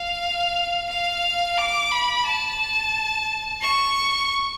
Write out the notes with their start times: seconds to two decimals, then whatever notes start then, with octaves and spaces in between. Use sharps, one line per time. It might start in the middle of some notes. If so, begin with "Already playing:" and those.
Already playing: F5
0.89 F5
1.58 D6
1.92 B5
2.25 A5
3.62 C#6